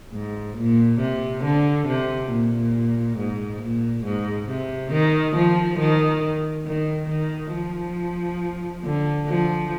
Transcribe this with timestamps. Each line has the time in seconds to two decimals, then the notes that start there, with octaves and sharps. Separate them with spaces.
0.13 G#2
0.56 A#2
1.00 C3
1.43 D3
1.87 C3
2.31 A#2
3.18 G#2
3.62 A#2
4.05 G#2
4.49 C3
4.92 D#3
5.36 F3
5.79 D#3
6.66 D#3
7.10 D#3
7.53 F3
8.84 D3
9.27 F3